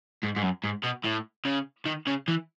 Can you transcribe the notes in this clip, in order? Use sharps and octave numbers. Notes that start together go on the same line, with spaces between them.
G#2
G#2
F#2
G#2
B2
A2
C#3
D#3
C#3
E3